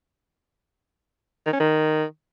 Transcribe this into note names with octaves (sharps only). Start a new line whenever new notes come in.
D#3
C#4
D#3